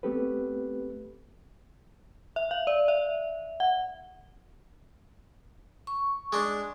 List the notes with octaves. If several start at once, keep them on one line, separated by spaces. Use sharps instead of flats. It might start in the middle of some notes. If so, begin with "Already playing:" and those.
A3 B3 C4 G4 A4 B4
E5
F5
D5
E5
F#5
C#6
G#3 D4